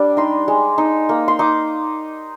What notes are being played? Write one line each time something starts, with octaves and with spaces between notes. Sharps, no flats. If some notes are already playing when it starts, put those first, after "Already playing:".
Already playing: G3 D4
D#4 C6
G#3
D#4
A#3
C6
D#4 D6